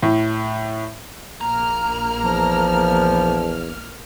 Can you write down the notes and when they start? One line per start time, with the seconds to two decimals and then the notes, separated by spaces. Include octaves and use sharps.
0.03 A2
1.41 A#1 A#3 A#5 F6
2.24 E2 F3